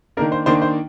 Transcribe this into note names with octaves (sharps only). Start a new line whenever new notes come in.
D#3 A#3 D4 A#4
C5
D#3 A#3 D4 C5
C5